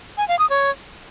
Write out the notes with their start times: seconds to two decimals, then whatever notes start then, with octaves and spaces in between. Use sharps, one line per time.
0.18 G#5
0.28 F5
0.39 D#6
0.50 C#5